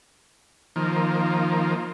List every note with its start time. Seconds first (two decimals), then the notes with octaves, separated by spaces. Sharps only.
0.76 D#3 F3 A#3